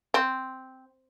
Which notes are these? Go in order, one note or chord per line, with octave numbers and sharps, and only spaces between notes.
C4